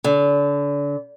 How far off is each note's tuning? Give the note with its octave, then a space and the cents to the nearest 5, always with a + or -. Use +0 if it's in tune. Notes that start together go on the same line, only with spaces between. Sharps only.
D3 -35